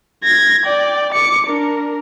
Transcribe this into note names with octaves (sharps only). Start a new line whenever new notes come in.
G#6 A#6
D5 G5
D6 C#7
D4 A#4